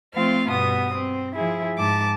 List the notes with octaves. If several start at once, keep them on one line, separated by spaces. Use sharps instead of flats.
F3 A3 C4 F4 F5
G2 B2 B3 D#6
C4
F3 E4 G#4
G#2 A5 D6